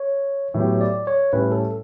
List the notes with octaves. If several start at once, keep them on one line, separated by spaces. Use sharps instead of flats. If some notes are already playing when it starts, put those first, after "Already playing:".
Already playing: C#5
A2 F#3 B3 E4 G4
D5
C#5
A2 G3 C#4 B4
A4